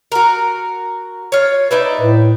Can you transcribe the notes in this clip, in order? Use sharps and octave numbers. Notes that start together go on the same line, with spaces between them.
F#4 A#4
F4 C#5
D#4 B4 D5 E5
A2